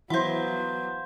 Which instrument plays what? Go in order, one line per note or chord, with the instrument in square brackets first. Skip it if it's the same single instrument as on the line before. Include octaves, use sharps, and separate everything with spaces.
[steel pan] E3 E4 [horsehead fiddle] F#3 B3 [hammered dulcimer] C5 C6 [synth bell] F5 F#5